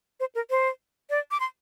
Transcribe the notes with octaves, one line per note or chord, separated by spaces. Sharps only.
C5
A#4
C5
D5
D6
C6